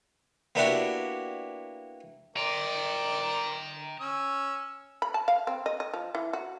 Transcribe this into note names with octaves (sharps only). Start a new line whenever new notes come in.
A#3 B3 D4 E4 F#4 G4
A#4 C5 D5 G5 A#5
C#4 E6
B5
A5
F5
C4
D#5
D#5
F3
E3
F#4